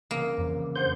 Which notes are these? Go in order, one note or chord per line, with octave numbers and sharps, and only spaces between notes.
C2 C#3 E3 A#3 D#6
F2
D4 G#4 C5 F#5 G6